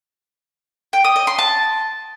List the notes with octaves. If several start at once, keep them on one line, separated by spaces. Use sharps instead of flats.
G5
D#6
D#5
C6
A5